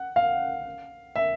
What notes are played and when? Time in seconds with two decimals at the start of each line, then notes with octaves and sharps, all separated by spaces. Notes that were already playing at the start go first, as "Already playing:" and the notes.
Already playing: F#5
0.16 F5
1.16 E5